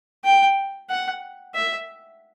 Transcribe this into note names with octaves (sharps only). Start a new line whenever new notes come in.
G5
F#5
E5